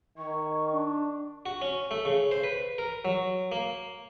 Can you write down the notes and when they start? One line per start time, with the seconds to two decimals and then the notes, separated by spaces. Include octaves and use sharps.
0.18 D#3 C#6
0.73 D4
1.46 F#4
1.62 C#4
1.91 A3
2.05 C#3
2.31 C5
2.43 B4
2.78 A#4
3.05 F#3
3.52 A#3